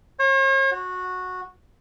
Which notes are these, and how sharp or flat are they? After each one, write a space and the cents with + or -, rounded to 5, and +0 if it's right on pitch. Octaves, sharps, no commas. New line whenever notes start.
C#5 -45
F#4 -15